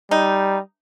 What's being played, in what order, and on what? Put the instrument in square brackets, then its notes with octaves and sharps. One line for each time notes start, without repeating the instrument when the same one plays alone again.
[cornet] G3 [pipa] D#4